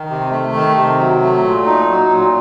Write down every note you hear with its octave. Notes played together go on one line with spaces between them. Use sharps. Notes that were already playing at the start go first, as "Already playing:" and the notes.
Already playing: D#3
C3
A3
D#3
C3
F#3
A3
A#2
D#4
F#3
A#2